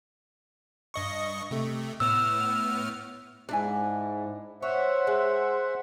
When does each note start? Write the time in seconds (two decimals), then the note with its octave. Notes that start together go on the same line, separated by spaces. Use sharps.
0.94 G2 D#5 C#6
1.51 C3 A3
2.00 A2 B3 E6 F6
3.49 G#2 D4 E4 G#5
4.62 C5 C#5 E5 F#5
5.07 G#3